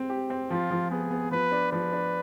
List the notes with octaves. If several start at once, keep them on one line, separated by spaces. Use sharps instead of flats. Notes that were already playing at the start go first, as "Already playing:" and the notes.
Already playing: C4
G4
C4
F3 F4
F3
B3 G#4
B3
F3 B4
D4
F3 B4
D4